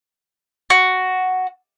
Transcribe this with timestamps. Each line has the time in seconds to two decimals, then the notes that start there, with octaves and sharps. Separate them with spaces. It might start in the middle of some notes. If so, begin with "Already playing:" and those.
0.70 F#4